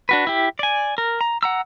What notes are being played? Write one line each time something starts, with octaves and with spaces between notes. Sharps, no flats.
D4 F#4 B4
E4 G4
D5 G#5
A#4
A#5
F#5 A#5 E6